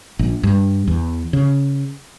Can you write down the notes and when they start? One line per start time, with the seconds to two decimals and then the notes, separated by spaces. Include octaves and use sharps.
0.19 A#1
0.43 G2
0.88 E2
1.33 C#3